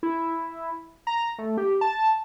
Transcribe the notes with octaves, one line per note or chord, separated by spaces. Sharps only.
E4
A#5
A3
G4
A5